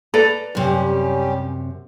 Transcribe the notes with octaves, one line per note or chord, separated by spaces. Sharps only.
A4 B4 D5 A#5
F#2 C3 G3 C#4 G4